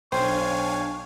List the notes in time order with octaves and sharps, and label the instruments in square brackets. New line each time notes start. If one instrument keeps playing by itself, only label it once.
[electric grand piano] B1 G5 [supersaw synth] D4 F5 G#5 [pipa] C5 [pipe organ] C#5